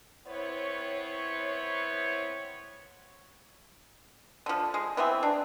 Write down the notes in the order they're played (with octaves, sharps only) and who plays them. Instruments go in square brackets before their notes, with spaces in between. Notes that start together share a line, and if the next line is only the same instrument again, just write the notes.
[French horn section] B3 C4 E4 C5 C#5
[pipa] D3 F3
G#3
E3 B3 C4 E5
D4